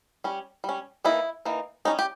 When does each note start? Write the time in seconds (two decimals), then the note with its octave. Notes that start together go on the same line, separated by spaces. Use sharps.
0.24 G3 C#4
0.64 G3 C#4
1.05 E3 A#3 D#4 E4
1.45 E3 A#3 D#4
1.85 G3 C#4 D#4
1.99 G4